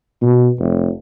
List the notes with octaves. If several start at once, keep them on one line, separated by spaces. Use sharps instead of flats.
B2
F1